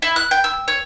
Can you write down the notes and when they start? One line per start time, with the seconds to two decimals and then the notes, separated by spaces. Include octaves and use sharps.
0.02 E4
0.16 F#6
0.31 G5
0.44 E6
0.68 C#5